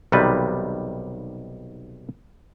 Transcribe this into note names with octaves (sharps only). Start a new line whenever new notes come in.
B1 C3 D#3 G3 B4